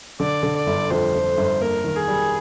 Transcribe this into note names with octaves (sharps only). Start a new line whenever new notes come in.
D3 D5
D3
D5
G1
F2 C5
F2
G1
A#3 A#4
D#3
G#4
G3